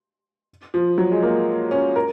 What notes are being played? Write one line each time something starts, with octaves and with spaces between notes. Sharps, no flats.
F3
F#3
G#3
A#3
C#4
A#4